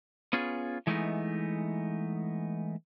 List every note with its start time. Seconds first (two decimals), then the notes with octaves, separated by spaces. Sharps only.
0.33 B3 C#4 F4 G#4
0.87 E3 G#3 A3 B3 D#4